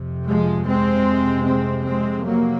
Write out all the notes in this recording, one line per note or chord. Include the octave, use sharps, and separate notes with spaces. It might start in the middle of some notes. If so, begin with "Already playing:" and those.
Already playing: F2 C3
F3 G#3
G#3 C4
G#3 C4
G#3 C4
F#3 A#3